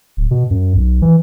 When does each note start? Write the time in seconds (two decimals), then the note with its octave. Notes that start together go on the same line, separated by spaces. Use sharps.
0.17 D1
0.31 B2
0.50 F#2
0.76 B1
1.02 E3